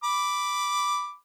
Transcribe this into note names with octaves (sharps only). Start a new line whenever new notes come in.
B5 D6